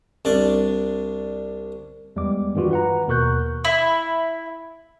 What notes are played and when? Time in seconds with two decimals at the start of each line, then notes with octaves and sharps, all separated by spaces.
0.25 C2 D4 D5
2.16 E2 G3 G#3 B3 D6
2.55 G2 D#3 E3 G3 F4 F#4
2.71 B4 F#5 A#5
3.08 D#2 B2 A#4 C#6 F#6 G6
3.65 E4